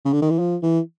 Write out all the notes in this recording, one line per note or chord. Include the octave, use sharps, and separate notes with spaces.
C#3
D3
D#3
E3
F3
E3